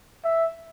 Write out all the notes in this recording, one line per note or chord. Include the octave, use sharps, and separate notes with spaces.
E5